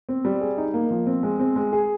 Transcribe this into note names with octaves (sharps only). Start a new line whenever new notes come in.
C4
G3
G#4
D#4
A#3
F3
C4
G#3
C4
G#3
G#4